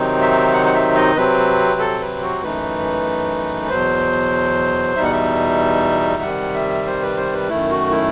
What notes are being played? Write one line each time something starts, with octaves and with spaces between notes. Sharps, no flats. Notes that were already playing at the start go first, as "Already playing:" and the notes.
Already playing: C3 D#3 F#3 C4 D#4
E5
F#5
F#5
E5
D#5
C3 F#3 C4 B4
A4
B4
F#4
F#2 E3 A3 D#4 B4
E2 B2 F#3 C5
E2 B2 G3 D#4 E5
F#5
E5
C3 D#3 G3 F#5
E5
C5
B4
C5
B4
F#2 D#3 A3 E4
F#4
E4